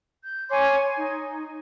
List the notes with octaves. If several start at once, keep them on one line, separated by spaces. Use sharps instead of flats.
G6
C#5 G#5 C6 D6
D#4